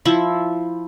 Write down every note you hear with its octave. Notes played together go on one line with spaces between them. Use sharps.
F3 E4